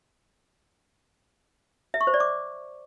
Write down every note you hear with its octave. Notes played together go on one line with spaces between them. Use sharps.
E5
C#6
C5
D5
D6